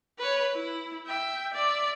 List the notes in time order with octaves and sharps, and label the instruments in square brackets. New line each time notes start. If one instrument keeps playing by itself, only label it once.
[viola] B4 C#5
E4
E5 G5
D5 E5